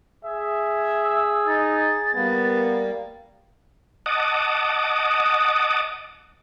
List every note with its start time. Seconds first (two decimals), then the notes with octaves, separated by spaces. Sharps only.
0.25 G#4 E5
1.05 E6
1.47 D#4 A6
2.15 G3 A#3 B3
4.06 D#5 F#5 A5 D6 D#6